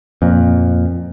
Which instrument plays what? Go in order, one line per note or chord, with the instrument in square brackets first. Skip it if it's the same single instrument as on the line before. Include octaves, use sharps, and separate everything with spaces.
[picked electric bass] F2 A#2